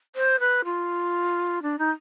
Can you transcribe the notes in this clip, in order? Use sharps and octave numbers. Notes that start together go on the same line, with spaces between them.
C5
B4
F4
D4
D#4